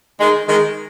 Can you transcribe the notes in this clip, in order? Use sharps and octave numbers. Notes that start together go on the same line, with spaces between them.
D#3 G#3
D#3 G#3